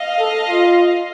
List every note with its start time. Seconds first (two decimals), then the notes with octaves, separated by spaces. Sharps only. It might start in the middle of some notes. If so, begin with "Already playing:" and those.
Already playing: D#5 F5
0.19 A4
0.48 F4